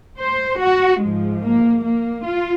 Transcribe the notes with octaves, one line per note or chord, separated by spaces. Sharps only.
C5
F#4
G#2 F3 G#3
A#3
A#3
F4